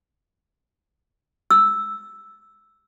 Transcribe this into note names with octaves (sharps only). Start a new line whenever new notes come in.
E6